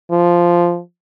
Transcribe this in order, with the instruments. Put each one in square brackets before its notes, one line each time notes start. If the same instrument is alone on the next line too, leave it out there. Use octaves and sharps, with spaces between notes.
[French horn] F3